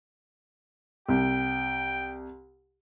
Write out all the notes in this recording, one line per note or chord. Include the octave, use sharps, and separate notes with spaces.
C2 G5